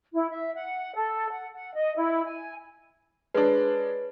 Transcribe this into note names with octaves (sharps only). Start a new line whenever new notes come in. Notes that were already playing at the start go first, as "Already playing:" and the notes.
E4
E5
F#5
A4
F#5
F#5
D#5
E4
G#5
G#3 D4 B4 C#5